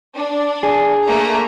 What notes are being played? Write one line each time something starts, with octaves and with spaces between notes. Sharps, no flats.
D4
G#4
A3 A#3 A#5